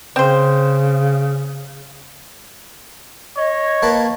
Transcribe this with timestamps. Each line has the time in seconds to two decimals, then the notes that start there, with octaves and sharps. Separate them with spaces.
0.16 C#3 C4 C5
3.37 C#5 D#5
3.82 A#3 B4 A5